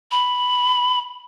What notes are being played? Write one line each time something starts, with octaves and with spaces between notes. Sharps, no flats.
B5